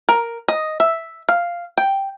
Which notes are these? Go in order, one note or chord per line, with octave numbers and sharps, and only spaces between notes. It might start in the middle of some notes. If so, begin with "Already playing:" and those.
A#4
D#5
E5
F5
G5